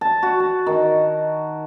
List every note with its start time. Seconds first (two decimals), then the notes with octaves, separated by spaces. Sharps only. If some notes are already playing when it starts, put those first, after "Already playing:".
0.01 A5
0.23 F#4
0.40 A5
0.67 D#3